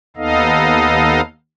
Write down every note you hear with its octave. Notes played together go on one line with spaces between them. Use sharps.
D#2 B3 D#4 A4 D#5 F5